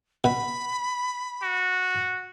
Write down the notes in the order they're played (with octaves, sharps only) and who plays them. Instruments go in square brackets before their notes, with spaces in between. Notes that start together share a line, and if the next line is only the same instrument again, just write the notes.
[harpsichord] B2 [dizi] B5
[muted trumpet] F#4